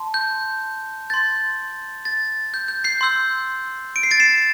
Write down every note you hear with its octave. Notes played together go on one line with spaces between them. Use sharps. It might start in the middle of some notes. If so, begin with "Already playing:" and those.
Already playing: A5 C6
G6
C6 G6 A6
A6
G6
G6
G6 C7
C6 E6 G6
D7
C7
A6 D7
C7 E7